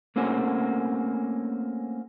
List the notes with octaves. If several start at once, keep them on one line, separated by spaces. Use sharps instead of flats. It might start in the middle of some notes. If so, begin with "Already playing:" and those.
A3 A#3 C4 C#4 F#4